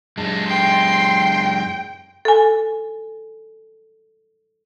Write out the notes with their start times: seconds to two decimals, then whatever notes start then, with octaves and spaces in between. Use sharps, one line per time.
0.18 F#2 G#3 A5
0.50 G5 C6
2.25 A4 G#5